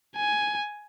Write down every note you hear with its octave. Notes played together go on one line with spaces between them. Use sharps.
G#5